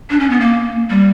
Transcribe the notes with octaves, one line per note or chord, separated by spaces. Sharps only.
D4
C#4
B3
A#3
G3